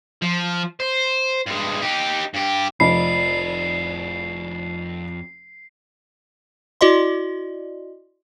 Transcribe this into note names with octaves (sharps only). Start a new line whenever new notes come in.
F3
C5
G2 G#3
D#4 G4
G2 G4
F1 F2 F3 D5 D#5 B5 C7
E4 F#4 D5 D#5 C6